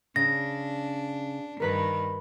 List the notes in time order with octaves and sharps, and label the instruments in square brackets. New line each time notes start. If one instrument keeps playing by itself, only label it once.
[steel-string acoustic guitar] C#3 [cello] D4 [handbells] A#6
[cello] G2 D#3 [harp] A#4 B4 B5